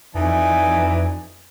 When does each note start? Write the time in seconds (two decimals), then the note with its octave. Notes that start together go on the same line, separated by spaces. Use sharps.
0.15 F2 E3 D#4 D5 G#5